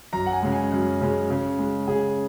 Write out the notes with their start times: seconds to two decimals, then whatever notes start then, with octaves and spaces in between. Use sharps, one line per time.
0.13 F#2 A#5
0.26 F#5
0.32 G#5
0.43 C#3 G#3
0.52 G#5
0.72 F#2
1.01 C#3 G#3
1.30 C#3
1.59 G#3
1.88 C#3 G#4